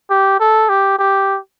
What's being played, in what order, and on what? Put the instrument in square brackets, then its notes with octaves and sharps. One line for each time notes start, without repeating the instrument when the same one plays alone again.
[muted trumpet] G4
A4
G4
G4